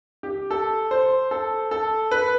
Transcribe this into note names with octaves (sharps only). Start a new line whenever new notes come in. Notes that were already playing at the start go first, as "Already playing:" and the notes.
G4
A4
C5
A4
A4
B4